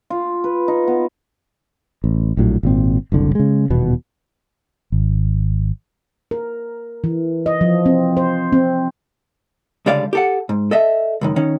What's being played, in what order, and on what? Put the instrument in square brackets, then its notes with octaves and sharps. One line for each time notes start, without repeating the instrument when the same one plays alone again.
[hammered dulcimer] F4
B4
D#4
B3
[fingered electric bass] A1
A#1 A2 F#3
G#1 A#2 C4
F#1 C2 D3
C#3 G#3
D#1 E2 B2 B3
G#1
[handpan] A#4
E3
D#5
F3
C4
C5
C4
[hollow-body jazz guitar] C#2 D3 G3 D5 F5
G4 A4 F#5
G#2
A4 D#5 E5
C#2 F#2 D#3
D#3 C#4